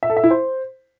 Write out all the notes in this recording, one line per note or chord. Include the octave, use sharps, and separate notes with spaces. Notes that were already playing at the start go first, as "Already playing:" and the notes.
E5
A4
E5
E4
C5